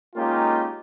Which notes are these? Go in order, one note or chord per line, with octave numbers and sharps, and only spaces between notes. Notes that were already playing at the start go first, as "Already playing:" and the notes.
G#3 A#3 C#4 D#4 F4 G4